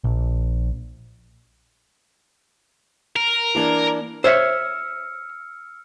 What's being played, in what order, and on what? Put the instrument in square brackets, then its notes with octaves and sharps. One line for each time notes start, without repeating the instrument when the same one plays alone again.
[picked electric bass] A#1
[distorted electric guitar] A#4
[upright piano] E3 A#3 D4
[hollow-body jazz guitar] C5 C#5 E5 [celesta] E6 F6 C#7